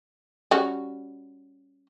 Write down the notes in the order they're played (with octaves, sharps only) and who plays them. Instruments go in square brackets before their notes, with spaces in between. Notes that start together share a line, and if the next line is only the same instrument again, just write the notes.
[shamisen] G3 C#4 F#4